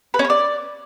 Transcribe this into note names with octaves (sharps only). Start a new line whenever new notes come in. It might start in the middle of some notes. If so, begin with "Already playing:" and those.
B4
C#4
C#5
D5